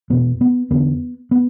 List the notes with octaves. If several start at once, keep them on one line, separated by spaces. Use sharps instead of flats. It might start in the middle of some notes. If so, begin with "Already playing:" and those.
E2 B2 B3
B3
E2 D3 B3
B3